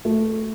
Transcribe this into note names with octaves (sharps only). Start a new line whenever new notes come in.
A3